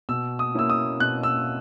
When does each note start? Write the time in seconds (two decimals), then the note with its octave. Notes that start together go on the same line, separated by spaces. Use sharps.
0.09 B2 E6
0.39 D#6
0.55 A#3 C#4 E4 E6
0.70 D#6
1.00 B2 F#6
1.23 E6